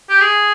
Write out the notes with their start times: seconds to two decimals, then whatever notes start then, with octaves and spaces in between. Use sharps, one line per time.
0.10 G4
0.21 G#4